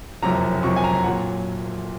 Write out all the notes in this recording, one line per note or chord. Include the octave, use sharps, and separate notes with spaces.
F#1 F2 C3 F#3 A#5
F#1 F2 C3 F#3 C#6
G#5
A#5
A#2 F#3 F#5